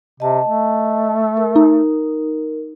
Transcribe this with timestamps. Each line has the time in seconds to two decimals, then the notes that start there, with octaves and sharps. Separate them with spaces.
0.20 C3 D#5 A5
0.45 A3
1.37 A#4
1.56 D#4